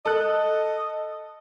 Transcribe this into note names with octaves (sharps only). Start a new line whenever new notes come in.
A4 D#5 F#6